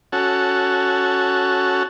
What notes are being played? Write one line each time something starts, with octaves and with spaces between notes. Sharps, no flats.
C#4 F#4 A4